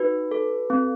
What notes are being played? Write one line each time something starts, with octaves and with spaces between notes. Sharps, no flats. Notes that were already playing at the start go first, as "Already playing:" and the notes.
Already playing: D#4 F#4 B4
A4
C4